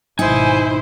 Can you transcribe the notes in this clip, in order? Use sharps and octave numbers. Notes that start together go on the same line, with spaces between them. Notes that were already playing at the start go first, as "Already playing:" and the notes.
G#1 B2 D#4 E4 C5 G#5